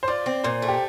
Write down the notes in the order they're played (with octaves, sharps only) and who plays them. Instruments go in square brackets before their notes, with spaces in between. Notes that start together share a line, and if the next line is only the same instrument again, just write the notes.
[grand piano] C5
[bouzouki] F4 [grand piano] D5
[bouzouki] C4
[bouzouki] A#2 [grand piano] C5
[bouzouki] A3
[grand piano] G4